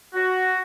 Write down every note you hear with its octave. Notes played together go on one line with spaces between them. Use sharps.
F#4